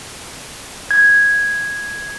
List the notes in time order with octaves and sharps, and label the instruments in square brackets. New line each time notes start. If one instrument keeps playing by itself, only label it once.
[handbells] G#6